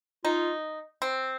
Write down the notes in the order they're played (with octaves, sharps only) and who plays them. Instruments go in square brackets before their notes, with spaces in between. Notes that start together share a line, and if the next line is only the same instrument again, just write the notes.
[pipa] D#4 [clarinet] F4
[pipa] C4